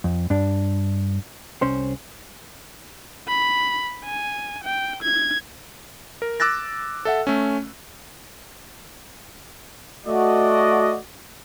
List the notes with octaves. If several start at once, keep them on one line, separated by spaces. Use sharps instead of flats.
F2
G2 D4
C2 C#4 C5
B5
G#5
G5
G#6
A#4
D6 E6 F#6 A6 A#6
A4 E5 F#5
A3 C#4
A3 F#4 D5 D#5